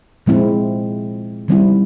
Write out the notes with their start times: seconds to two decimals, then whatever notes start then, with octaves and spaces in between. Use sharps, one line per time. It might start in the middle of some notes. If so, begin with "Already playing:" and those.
0.26 A#2 F3 G#3 C4 E4
1.48 D#3 G3 C4 E4